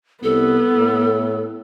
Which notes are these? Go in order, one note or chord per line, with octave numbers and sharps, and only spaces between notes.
C2 B3 A4
A2